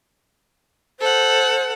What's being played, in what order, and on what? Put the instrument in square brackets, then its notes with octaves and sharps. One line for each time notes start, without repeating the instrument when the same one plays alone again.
[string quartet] A4 F#5 [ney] C5